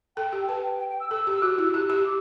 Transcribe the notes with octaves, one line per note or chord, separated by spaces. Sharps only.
A4 G5
G4
G5
B4 A5
G5
G5
G5
E6
A4 E6
G4
E6
F#4 F#6
E4 E6
G4 F#6
G4 E6
D6